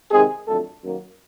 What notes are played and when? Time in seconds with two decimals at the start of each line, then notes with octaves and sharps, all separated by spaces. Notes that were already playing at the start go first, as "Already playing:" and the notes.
0.11 C3 D#3 G#3 C4 G#4
0.47 F2 D3 F#3 A3 A4
0.83 F#2 D#3 F#3 A#3